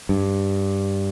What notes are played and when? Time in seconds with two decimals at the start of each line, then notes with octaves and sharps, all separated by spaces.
0.09 G2